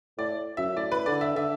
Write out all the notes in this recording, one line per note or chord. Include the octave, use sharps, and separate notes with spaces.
A2 D5
F#2 E5
A2 D5
B4
D3 D5
E5
D3 E5